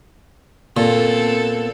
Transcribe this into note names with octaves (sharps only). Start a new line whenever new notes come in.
A#2 B3 C4 A4